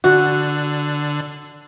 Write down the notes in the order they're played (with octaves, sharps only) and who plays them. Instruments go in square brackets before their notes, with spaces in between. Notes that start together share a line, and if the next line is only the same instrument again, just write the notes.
[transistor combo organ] D3 [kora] F#4